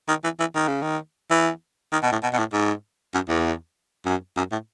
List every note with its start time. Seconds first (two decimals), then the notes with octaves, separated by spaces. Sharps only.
0.08 D#3
0.24 E3
0.40 E3
0.55 D#3
0.67 C#3
0.82 D#3
1.30 E3
1.92 D#3
2.02 B2
2.12 A2
2.23 B2
2.33 B2
2.38 A2
2.53 G#2
3.14 F#2
3.29 E2
4.05 F#2
4.37 F#2
4.51 A2